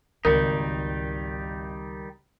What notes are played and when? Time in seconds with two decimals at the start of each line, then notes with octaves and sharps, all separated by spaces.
0.25 G#1 C#2 D#3 G3 D#4 A#4 C#7